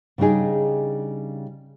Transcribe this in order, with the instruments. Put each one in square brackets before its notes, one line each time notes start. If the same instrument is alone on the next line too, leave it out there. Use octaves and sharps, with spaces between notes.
[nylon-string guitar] C#3 G3 D4 D#4 G#4